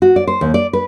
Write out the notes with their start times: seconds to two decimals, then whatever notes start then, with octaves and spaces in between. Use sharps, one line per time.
0.02 F#4
0.16 D5
0.27 C5
0.41 D#2
0.54 D5
0.73 B4